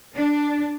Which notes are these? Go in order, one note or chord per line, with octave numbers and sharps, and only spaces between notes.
D4